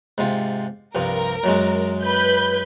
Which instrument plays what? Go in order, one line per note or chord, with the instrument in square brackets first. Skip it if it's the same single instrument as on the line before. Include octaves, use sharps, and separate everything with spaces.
[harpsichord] G#2 C3 F4
[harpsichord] C2 G2 F3 [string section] A#4
[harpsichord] F#2 F#3 G#3
[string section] B4 G6